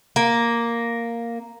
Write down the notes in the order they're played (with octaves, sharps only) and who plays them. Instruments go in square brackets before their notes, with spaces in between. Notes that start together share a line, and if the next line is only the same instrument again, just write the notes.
[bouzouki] A#3